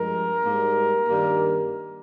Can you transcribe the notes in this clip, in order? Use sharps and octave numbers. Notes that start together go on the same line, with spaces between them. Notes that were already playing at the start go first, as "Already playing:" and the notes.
Already playing: G2 F3 G#3 A#4
G#2 G3 A#3
G2 D#3 G3 A#3